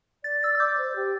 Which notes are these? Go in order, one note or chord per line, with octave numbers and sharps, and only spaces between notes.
D5 A6
D5 E6 A6
E6
D5 D6 G6
C5
G4